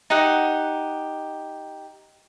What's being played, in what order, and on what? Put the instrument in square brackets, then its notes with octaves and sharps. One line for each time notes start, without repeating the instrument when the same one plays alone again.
[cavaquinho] D#4 G4 F#5